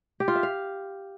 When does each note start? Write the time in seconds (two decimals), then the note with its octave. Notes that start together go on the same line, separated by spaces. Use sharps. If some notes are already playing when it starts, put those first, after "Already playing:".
0.20 G4
0.28 F4
0.35 E5
0.43 F5